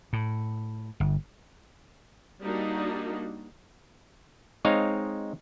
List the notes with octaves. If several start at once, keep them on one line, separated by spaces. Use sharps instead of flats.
A2
G1
G3 A#3 D4 D#4 F#4
G#3 C4 D#4 C#5 F5